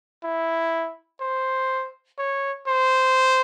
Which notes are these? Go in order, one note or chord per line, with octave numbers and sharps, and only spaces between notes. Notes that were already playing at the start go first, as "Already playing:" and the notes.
E4
C5
C#5
C5